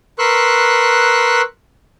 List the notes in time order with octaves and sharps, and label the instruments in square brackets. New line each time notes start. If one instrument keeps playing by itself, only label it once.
[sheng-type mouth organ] A#4 B4 C6 C#6 E6 F#6